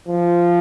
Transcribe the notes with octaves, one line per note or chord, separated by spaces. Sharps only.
F3